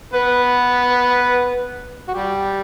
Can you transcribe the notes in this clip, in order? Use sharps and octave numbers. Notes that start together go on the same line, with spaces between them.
B3 B4
F#4
G3 G4